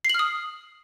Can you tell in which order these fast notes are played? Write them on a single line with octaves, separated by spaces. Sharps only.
C7 F#7 F6 D#6